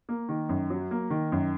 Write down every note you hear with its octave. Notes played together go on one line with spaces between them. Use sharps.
A#3
D#3
F#2
F#3
A#3
D#3
F#2